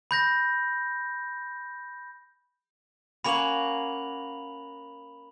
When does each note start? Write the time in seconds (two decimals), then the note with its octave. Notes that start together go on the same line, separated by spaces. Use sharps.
0.11 B5 G6 A#6
3.24 A#3 C#4 F#4 B5 F7 F#7